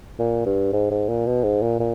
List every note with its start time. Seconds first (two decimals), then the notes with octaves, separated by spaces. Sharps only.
0.19 A#2
0.46 G2
0.73 G#2
0.91 G#2
1.08 A#2
1.26 B2
1.44 G#2
1.62 A#2
1.79 A#2